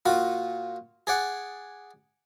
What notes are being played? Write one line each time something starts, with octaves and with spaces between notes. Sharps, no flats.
A#2 F4 F#4
G#4 D5 F#5